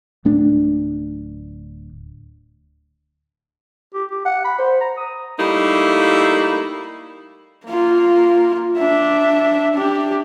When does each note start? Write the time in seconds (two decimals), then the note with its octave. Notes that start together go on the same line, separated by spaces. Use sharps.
0.25 D1 A3 D4
3.94 G4
4.11 G4
4.25 F#5
4.45 B5
4.58 C5
4.81 A#5
4.97 D#6
5.38 G3 A3 A#3 D#4 E4
7.66 A#3 F4
8.77 D4 E5
9.75 D4 G4